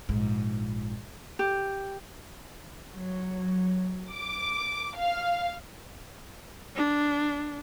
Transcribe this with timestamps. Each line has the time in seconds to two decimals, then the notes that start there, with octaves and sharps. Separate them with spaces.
0.09 A#1 G#2
1.39 G4
2.93 F#3
4.11 D6
4.98 F5
6.76 D4